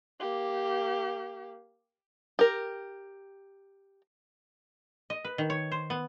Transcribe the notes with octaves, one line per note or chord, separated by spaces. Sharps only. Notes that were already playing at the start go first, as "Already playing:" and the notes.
A#3 G4
G4 A#4
D#5
B4
D#3
C#5
C5
B3